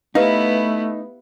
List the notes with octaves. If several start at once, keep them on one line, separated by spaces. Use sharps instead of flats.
A3 B3 D#4 E4 G4 B4 F5